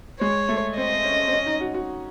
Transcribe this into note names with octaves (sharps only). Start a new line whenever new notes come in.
G#3 C#5
A3
C4 D#5
C#4
C4
C#4
D#4
F#4
F#4